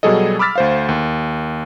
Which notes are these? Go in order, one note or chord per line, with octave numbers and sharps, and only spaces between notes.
B2 F#3 G3 G#4 A4 D#5
B5 D6 E6 F6 A6 B6
D2 C5 F5
D#2